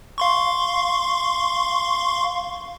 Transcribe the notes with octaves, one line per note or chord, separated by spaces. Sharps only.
F5 C6 C#6